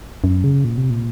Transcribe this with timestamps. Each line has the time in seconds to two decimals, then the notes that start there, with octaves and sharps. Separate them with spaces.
0.24 F#2
0.44 C#3
0.64 A#2
0.77 C3
0.90 A#2